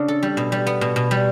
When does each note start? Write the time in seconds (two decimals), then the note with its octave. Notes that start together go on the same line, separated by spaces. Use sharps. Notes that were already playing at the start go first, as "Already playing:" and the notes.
Already playing: C#3 D4
0.08 A4
0.23 G3
0.37 B2
0.52 G3
0.67 B3
0.81 B2
0.96 B2
1.11 G3